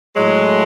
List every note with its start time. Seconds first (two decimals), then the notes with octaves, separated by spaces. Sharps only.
0.16 A2 F#3 G#3